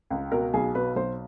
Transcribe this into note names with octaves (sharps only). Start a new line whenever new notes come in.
C#2
B2 A#4
B1 G#4
B2 B4
B1 C5